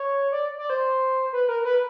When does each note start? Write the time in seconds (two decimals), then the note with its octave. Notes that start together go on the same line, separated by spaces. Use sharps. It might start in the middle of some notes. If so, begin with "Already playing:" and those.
Already playing: C#5
0.32 D5
0.58 D5
0.70 C5
1.33 B4
1.49 A#4
1.65 B4